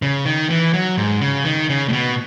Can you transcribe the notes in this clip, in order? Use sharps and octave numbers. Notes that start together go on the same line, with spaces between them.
C#3
D#3
E3
F#3
G#2
C#3
D#3
C#3
A2
B2